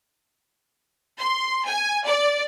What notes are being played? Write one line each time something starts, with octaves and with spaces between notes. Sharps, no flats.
C6
G#5
D5